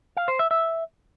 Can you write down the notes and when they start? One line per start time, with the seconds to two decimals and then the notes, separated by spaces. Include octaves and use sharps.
0.17 F5
0.28 C5
0.39 E5
0.51 E5